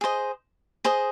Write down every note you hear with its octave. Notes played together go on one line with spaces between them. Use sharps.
G#4 C5 D#5
G#4 C5 D#5